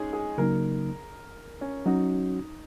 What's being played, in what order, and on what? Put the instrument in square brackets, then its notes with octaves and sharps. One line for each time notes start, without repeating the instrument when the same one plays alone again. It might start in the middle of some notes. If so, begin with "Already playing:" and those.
Already playing: [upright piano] G#3 C#4 D#4 G#4
G#4
[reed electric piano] C#3 F#3 A#3 D#4 [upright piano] A#4
[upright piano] C#4
[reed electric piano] F#3 C#4 F#4 [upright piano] D#4